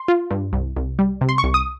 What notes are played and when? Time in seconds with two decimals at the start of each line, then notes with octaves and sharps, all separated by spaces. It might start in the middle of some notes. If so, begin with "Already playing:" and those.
Already playing: C6
0.08 F4
0.31 G2
0.53 C2
0.77 C2
0.99 G3
1.21 C3
1.29 C6
1.38 C#6
1.44 C2
1.54 D#6